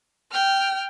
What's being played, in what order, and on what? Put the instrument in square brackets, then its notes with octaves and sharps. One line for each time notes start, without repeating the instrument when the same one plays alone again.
[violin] G5 F6